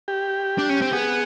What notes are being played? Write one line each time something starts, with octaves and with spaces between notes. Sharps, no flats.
G4
D4
C#4
C4
B3 G#4